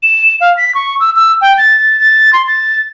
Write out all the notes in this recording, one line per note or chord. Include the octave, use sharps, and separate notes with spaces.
E7
F5
B6
C#6
E6
E6
G5
A6
A6
A6
C6
A6